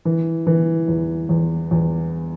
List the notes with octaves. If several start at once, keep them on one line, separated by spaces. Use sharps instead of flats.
E3
E3
E2
E2
E2